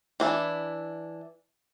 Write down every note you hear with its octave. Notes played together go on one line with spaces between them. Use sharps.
E3 D4 E4